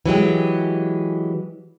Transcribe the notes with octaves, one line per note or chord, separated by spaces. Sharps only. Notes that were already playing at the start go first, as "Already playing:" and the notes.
E3 F#3 G#3 G4